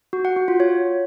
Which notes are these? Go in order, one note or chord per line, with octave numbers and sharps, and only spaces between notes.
F#4
F#5
F#4
F4
C#5